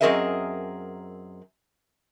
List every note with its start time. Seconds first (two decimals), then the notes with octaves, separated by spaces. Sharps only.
0.01 F#2 C4 G#4 A#4 D#5 E5